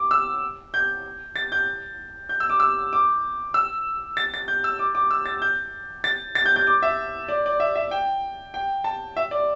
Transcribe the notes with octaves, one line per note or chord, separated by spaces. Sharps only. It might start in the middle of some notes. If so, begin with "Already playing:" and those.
Already playing: D6
E6
G6
A6
G6
G6
E6
D6
E6
D6
E6
A6
A6
G6
E6
D6
D6
E6
A6
G6
A6
A6
G6
G6
D6
E5
D5
D5
E5
E5
G5
G5
A5
E5
D5